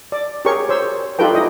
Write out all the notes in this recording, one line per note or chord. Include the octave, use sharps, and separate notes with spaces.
D5
G4 G#4 A#4 C#5 C#6
C5 C#5 E6
D#4 F4 G4 A4 B4 G5
E4 D#5